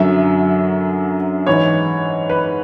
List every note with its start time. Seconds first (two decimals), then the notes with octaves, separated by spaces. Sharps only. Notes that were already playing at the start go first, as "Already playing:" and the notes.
Already playing: F#2 D3 F#3 E5
1.46 G#2 E3 C#5
2.30 B4